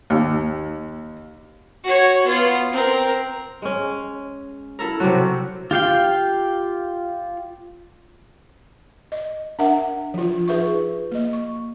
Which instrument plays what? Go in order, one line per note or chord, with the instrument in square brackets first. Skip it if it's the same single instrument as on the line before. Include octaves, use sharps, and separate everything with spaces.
[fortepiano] D#2
[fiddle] F#4 C#5
B3 F4
C4 A#4
[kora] G#3 C#4
[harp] E4 A4 A#4
[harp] C3 F#3 [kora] F#4 G4
[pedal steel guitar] F4 G4 F5 G5
[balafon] D#5
D4 A#4 E5 F#5
F3 F4
D#4 G#4 B4 E5 C#6
A#3 D#5
C#6